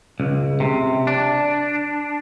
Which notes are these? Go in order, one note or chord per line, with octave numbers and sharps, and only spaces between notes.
C#2
C3
D4